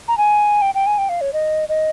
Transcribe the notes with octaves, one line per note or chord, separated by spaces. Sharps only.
A#5
G#5
G5
G5
G#5
G5
F5
C#5
D#5
D#5